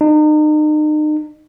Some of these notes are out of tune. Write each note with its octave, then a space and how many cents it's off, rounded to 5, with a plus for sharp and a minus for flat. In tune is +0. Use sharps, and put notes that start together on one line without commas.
D#4 -35